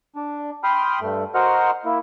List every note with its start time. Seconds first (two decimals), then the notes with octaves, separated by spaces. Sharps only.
0.16 D4
0.64 G5 B5 C6 D#6 F6
1.01 G2 A3
1.35 F#4 A#4 C5 D#5 F#5 F6
1.85 A#3 E4